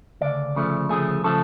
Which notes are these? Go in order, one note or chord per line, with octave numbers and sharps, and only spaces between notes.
D2 C#3 D5
D2 C#3 F3 A3
D2 C#3 F3 A3 G#4
C#3 F3 A3 A4